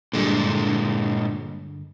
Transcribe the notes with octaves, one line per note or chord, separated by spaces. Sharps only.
G2 A#2 D3 G#3